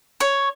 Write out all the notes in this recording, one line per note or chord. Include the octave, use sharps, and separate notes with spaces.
C#5